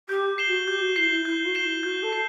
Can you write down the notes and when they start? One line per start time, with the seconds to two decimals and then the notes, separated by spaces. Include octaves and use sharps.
0.09 G4 G6
0.38 C7 E7 G7
0.47 F#4
0.67 G4 G6
0.82 F#4
0.96 E4 C7 E7 G7
1.11 E4
1.25 E4 G6
1.45 F#4
1.55 C7 E7 G7
1.64 E4
1.83 F#4 G6
2.02 A4
2.13 C7